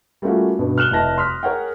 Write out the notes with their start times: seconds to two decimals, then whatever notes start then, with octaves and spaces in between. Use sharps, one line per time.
0.22 G3 A3 A#3 C#4 F4 F#4
0.59 G2 B2
0.78 F6 F#6 E7 F#7 G7
0.90 F1 E4 D#5 A5 A#6
1.18 C6 D#6 F6 B6
1.43 G#4 A#4 C#5 F#5 G5